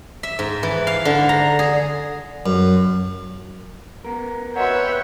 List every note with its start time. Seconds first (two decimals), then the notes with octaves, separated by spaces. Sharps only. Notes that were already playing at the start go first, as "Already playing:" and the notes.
0.23 E5
0.39 G#2
0.63 E3
0.87 F5
1.05 D3
1.29 A#5
1.59 G#4
2.46 F#2
4.05 B3 A#4
4.56 F#4 B4 C#5 D#5 E5 F#5 G5